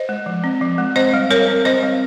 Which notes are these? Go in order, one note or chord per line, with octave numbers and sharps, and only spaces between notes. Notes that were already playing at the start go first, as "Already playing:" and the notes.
Already playing: C5 D#5
G#3
F3
C4
F3
G#3
C4 C5 D#5
G3
G3 A#4 C#5
C4
C4 C5 D#5
G3